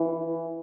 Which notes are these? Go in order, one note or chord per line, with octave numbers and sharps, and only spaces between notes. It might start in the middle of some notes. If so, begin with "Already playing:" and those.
Already playing: E3